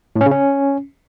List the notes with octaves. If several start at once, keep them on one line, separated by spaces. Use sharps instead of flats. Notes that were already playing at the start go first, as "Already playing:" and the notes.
A2
C#4
C#3
C#4